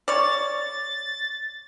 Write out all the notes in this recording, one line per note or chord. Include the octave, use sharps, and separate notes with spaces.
C#5 D5 A6